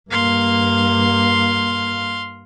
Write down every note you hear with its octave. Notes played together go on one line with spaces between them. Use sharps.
G2 A#3 F5 C6